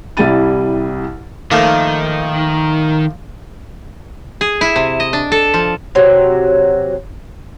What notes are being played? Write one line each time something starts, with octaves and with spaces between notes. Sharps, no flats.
C2 G3 E4 G5 A6 D#7
D#3 F3 A3 A#3
G#4
E4
C3
D#5
D4
A4
F3
C3 F#3